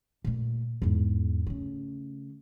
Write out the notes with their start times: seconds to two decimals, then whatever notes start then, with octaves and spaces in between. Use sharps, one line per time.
0.25 A#2 A3
0.82 E2 G#2
1.47 C#3 A3